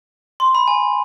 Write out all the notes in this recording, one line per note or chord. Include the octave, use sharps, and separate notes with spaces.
C6
B5
G#5